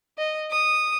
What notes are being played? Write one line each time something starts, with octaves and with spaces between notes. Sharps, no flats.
D#5
D#6